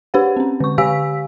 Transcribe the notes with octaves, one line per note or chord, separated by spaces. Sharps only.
D4 G4 B4 C5 F#5
C4 C#4
D3 C#6
D3 G4 F5 G#5 E6 B6